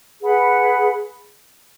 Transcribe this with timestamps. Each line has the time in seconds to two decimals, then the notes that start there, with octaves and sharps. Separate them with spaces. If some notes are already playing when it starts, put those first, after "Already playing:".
0.20 G#4 B4 F#5 B5